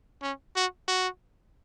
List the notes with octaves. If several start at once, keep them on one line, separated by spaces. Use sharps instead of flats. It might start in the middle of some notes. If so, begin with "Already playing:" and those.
C#4
F#4
F#4